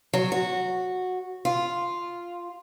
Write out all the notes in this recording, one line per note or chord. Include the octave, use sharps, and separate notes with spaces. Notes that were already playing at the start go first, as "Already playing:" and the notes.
F#3
F#4
F4